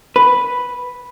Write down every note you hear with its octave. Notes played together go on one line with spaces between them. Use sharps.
B4